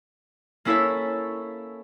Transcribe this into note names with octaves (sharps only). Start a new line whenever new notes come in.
A#3 C#4 E4 A4 C#5 E5